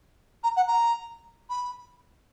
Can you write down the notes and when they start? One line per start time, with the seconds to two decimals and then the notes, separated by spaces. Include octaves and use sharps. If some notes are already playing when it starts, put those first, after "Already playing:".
0.43 A#5
0.56 F#5
0.67 A#5
1.49 B5